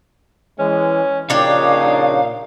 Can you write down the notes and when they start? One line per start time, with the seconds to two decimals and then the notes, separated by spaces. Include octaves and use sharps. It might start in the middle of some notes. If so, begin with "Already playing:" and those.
0.59 E3 G#3 C#4
1.30 A#1 A#2 C#3 D4 D#4 G4 C#5 F5